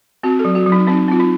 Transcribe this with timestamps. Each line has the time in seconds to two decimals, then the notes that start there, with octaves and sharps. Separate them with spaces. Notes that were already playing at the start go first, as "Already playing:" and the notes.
0.23 C4 F#4
0.39 A4
0.45 F#3
0.55 F#4
0.66 F#3
0.72 D#4
0.87 C4 D#4
1.08 C4 F4
1.20 D#4